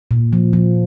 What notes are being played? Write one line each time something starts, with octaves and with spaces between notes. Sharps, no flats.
A#2
F3
F3